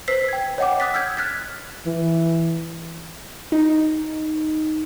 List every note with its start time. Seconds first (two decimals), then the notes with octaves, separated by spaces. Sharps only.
0.08 B4 C5 E6 B6 C7
0.28 G5 G#6
0.58 C#5 D#5 F#5 G5 D6
0.80 D6 D#6 F#6 A6 B6
0.94 E6 F6 G6 G#6
1.17 F6 F#6 G#6 A6 B6
1.86 E3
3.52 D#4